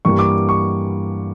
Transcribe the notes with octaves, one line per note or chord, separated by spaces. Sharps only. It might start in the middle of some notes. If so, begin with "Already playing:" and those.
G2 E3 G3 A#3 C#6
D6
C#6